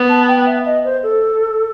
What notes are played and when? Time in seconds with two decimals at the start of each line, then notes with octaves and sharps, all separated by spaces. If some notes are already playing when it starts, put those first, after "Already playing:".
Already playing: B3
0.10 A5
0.28 G5
0.46 E5
0.66 D#5
0.85 C5
1.03 A4